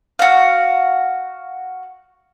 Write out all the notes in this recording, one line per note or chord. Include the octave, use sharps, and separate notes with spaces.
F#4 F5